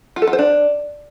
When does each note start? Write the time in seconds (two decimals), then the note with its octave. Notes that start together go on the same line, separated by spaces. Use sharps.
0.16 F4
0.22 A4
0.27 F4
0.33 C5
0.39 D4